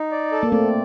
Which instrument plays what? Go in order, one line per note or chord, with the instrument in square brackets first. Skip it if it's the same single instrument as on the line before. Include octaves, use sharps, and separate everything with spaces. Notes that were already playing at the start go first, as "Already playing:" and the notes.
Already playing: [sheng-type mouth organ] D#4
D5
A4
[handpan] A#3
[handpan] A3 C4 [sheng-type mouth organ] D5